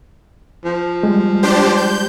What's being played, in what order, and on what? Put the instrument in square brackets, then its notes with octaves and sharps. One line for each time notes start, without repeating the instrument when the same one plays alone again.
[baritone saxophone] F3
[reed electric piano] G3 G#3
[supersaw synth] D4 G4 C5
G6